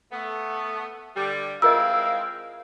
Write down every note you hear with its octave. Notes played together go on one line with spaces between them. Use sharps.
A3 B3
D3 G3
G#3 C4 E4 F4 A#4 D#5 F5 E6